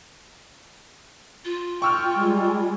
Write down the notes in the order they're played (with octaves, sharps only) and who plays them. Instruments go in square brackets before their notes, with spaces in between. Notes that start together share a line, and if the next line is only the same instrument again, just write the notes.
[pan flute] F4
[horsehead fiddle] G5 [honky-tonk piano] C#6 E6 F6
[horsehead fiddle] G3 G#3